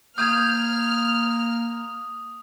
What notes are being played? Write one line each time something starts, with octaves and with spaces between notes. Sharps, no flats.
A#3 D#6 F6 G6 G#6